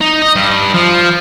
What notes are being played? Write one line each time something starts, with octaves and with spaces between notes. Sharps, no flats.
D#4
D#5
G2
F3